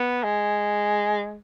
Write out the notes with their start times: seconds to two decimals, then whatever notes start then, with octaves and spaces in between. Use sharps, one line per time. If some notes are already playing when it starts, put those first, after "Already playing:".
Already playing: B3
0.23 G#3